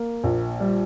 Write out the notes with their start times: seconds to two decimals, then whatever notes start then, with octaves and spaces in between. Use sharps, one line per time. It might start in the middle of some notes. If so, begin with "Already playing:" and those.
Already playing: A#3
0.24 A#1
0.60 G3